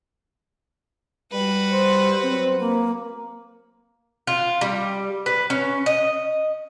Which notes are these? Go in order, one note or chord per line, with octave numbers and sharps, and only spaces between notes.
G3 F#4 B4
C5
F#3 C4
A#3
F4
G3
B4
C#4
D#5